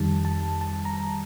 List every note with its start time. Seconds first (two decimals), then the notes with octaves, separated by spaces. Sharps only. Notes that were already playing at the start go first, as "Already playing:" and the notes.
Already playing: F2 D#3 G3 A5
0.25 A5
0.61 A5
0.85 A#5